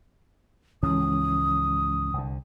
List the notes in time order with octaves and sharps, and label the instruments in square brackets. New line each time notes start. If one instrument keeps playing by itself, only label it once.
[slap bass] C#2 G#2 F3 [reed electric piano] E3 G#3 C#4 [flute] D#6
[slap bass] C2 D3